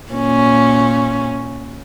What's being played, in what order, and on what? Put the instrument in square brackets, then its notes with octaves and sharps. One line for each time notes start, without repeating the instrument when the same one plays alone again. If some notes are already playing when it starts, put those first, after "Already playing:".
[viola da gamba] A#2 C#4